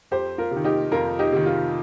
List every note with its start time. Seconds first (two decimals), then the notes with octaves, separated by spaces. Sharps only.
0.11 F2 G4 C5
0.38 F4 A#4
0.51 C3
0.56 D#3
0.64 D#4 G4
0.91 F2 F4 A#4
1.19 D#4 G4
1.32 C3 D#3
1.46 F4